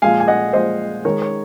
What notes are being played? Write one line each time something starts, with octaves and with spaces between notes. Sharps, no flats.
A#2 F3 G#3 F5 G#5
G#5
D#5 F#5
A#2 F3 G#3 C5 D#5
D#3 G#3 A#4 C#5
C#5